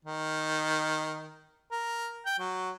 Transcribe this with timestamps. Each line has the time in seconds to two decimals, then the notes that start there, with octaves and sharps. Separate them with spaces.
0.05 D#3
1.72 A#4
2.26 G5
2.39 F#3